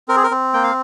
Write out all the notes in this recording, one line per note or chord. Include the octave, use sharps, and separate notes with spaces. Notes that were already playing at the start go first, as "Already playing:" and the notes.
C4 A#4
G#4
A#4
C4
A#3 G5
F5